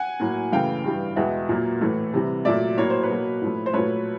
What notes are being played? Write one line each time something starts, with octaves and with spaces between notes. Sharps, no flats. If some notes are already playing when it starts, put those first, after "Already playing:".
Already playing: F#5 G#5
A2 F#3 A#3
F#2 C#3 E3 A3 F5 G5
G2 E3 G3
E2 B2 G#3 E5 F#5
A#2 F#3 A#3
A2 E3 A3
C3 E3 G3
A#2 F#3 A3 D5 E5
A2 F#3 A#3 C#5
C5
B4 C#5
B2 F#3 A#3
A2 F3 A3
C5
A#2 F#3 A3 B4 C#5